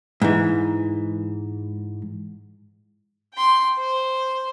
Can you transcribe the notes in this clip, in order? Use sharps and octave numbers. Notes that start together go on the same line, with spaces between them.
G#2 E3
G5 C6
C5